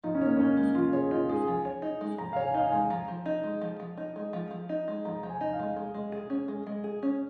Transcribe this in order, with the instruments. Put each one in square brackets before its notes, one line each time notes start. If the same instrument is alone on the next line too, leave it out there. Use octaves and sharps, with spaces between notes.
[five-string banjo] F3 [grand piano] D#4
[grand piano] C#4
[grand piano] A#3 [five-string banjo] C#5
[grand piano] C#4 [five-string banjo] D#4
[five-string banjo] G#3
[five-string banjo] F3 [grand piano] F4
[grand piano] G#4 [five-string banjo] C#5
[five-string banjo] D#4 [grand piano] F4
[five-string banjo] G#3 [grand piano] G#4
[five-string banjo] F3 [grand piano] G#5
[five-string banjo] C#5
D#4
G#3
[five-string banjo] F3 [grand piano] A#5
[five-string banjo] C#5 [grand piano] F5
[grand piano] G#5
[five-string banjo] D#4 [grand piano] F5
[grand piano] G#5
[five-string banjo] G#3
[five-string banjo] F3 [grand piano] A#5
[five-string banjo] F3
D#4
G#3
F3
F3
D#4
G#3
F3
F3
D#4
G#3
[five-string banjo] F3 [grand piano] A#5
[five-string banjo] F3
[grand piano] G#5
[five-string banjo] D#4
[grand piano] F5
[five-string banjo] G#3
G#3
G#3
G#4
C#4
G#3
G#3
G#4
C#4